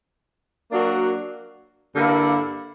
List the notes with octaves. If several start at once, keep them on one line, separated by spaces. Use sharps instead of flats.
F#3 A#3 D4 F#4 A#4
G2 D3 A#3 E4